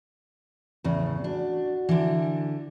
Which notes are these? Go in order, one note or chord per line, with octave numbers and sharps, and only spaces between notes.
E2 A2 C#3
D4 F#4
D3 E3